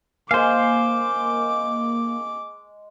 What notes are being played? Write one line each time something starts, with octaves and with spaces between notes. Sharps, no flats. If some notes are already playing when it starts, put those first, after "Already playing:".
G#3 A#3 C5 F5 G#5 D6